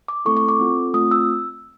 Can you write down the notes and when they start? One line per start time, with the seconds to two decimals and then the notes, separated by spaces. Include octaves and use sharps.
0.08 D6
0.25 A3 C4 E4 A4 C#6
0.37 C#6
0.48 D6
0.59 C4 F4 A4
0.94 A3 C4 F4 D#6
1.11 E6